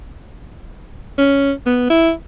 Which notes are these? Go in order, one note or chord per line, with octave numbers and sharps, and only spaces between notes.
C#4
B3
E4